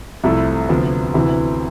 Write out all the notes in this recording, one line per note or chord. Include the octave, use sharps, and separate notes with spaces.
C2 C3 F3 A3 E4
D2 C3 F3 B3
D2 C3 E3 B3 E4